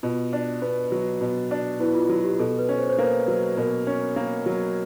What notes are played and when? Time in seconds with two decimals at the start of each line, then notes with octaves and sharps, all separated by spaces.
0.03 B2 F4
0.33 D4
0.62 B3
0.92 F#3
1.21 B2
1.51 D4
1.80 B3 E4
1.95 F4
2.09 F#3 F#4
2.25 G4
2.39 B2 A4
2.59 B4
2.69 C#4
2.78 C5
2.89 C5
2.98 A#3 B4
3.28 F#3 B4
3.57 B2 A#4
3.87 C#4
4.16 A#3
4.46 F#3